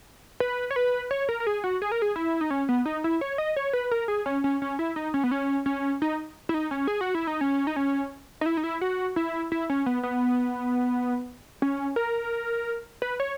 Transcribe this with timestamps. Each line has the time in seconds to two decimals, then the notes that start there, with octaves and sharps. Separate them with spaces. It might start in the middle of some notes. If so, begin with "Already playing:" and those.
0.40 B4
0.71 C#5
0.76 B4
1.11 C#5
1.29 A#4
1.40 A#4
1.47 G#4
1.64 F#4
1.82 G#4
1.92 A#4
2.02 G#4
2.16 E4
2.41 D#4
2.51 C#4
2.69 B3
2.86 D#4
3.04 E4
3.21 C#5
3.38 D#5
3.56 C#5
3.73 B4
3.91 A#4
4.08 G#4
4.26 C#4
4.44 C#4
4.62 C#4
4.79 E4
4.96 D#4
5.14 C#4
5.24 B3
5.31 C#4
5.66 C#4
6.02 D#4
6.49 E4
6.54 D#4
6.71 C#4
6.87 G#4
7.01 F#4
7.15 E4
7.27 D#4
7.41 C#4
7.67 D#4
7.76 C#4
8.41 D#4
8.46 E4
8.57 D#4
8.64 E4
8.81 F#4
9.16 E4
9.52 E4
9.70 C#4
9.86 B3
10.03 B3
11.62 C#4
11.96 A#4
13.02 B4
13.20 C#5